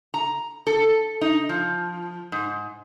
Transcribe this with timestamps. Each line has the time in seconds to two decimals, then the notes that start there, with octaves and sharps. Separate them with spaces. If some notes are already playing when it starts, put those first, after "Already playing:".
0.14 A#5
0.67 A4
1.21 D#4
1.49 F3
2.32 G#2